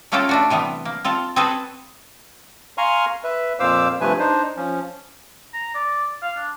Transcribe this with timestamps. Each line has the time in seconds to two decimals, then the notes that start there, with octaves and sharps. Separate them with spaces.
0.12 A3 A#3 C#4 F4 A4 G5
0.29 A3 D4 F#4
0.50 C3 E3 G3 B3
0.85 A#3
1.05 C4 F4 A4
1.36 C4 F#4 G#4 A4 B4 C5
2.78 F5 G#5 A#5 C6 C#6 F6
3.24 B4 E5
3.60 F2 A#2 C5 F5 D6 E6
4.01 G2 C3 F3 A3 B4 G#5
4.19 D4 D#4 C5
4.57 F3 C#4
5.54 A#5
5.75 D5
6.22 F5
6.37 D4